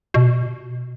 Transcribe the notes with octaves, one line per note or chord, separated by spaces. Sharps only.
B2